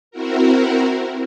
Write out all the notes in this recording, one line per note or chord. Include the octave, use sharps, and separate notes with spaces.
C4 E4 F#4 A#4